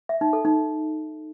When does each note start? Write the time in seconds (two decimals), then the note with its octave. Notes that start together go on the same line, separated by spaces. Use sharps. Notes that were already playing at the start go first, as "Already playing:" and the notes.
0.09 E5
0.21 D#4
0.33 A4
0.45 D#4